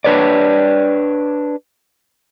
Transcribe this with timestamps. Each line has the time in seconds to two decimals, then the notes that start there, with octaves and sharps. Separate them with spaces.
0.04 D4 B4 C#5 D5